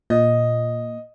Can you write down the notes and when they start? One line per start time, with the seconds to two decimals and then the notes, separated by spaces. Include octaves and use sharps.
0.10 A#2 D#5